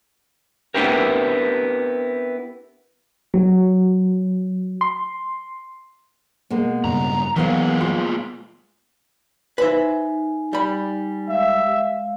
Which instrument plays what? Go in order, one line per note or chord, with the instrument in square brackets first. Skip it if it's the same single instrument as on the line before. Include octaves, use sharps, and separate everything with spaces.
[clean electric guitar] B3 C4 D4 E4 G4 A#4
[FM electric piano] F#3
C6
[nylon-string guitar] B2 G#3 A#3
[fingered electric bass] G2 C#3 [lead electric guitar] A#5
[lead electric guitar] A#2 G#3 [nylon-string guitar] D#3 B3 F5 [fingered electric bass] E3 F#3
[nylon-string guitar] F4
[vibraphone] D#4 G#5 [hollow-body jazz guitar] B4 C5 E5
[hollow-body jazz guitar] G3 B5
[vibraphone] G#3 F5 [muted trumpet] E5